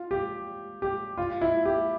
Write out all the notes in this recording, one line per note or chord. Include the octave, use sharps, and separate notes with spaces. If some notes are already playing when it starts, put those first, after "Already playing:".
Already playing: F4
G4
G4
F4
E4
G4